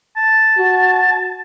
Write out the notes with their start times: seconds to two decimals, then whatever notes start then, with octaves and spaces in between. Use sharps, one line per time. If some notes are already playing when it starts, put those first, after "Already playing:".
0.17 A5
0.58 F#4